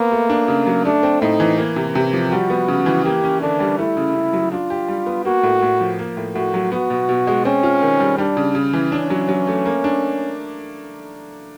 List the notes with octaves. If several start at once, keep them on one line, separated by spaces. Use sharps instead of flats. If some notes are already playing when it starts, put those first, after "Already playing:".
Already playing: A#3 B3
A3
D4
C#3
F#3
A3 D4
C4
A2 D#4
E3
A#3
C3
C3
F3
G3 F#4
B3
C#3
E3
A#3 G4
C#4
D3 D4
G3
A3 E4
C#3
C#3
F#3
D4 F4
G4
G3
B3
A#3 F#4
A2
A2
F3
A#3
A2
A2 F#4
F#3
B3 F#4
B2
B2
G#3
C4 C#4
F4
D#3
G3
G3 D4
C#3
C#3
E3
C#4 D4
F#3
F#3
A3
A#3
D4